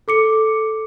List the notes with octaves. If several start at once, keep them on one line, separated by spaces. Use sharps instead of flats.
A4 D6 C#7